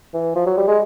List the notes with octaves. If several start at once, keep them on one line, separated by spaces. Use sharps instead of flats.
E3
F3
F#3
G3
G#3